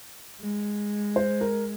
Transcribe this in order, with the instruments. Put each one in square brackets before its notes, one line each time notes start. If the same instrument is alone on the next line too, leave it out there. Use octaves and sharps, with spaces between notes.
[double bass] G#3
[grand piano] C5
A#4